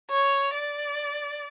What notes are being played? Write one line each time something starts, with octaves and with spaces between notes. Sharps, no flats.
C#5
D5